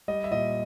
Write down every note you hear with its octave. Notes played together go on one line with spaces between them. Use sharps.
G3 D#5
E5
A#2 D#5